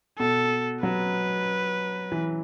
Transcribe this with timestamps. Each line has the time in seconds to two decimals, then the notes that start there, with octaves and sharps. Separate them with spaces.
0.19 B2 A4
0.83 F#3 B4
2.12 E3